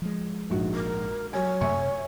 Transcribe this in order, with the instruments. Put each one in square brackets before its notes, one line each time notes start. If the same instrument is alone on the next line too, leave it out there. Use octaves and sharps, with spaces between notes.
[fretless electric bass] F3 G#3
[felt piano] A#1 G#2 F#4
[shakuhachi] A#4
[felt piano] F#3 G#5 [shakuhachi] C#5
[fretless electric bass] F#2 C3 A3 [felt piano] E5 G#5 C#6